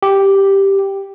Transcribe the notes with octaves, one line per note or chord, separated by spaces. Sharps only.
G4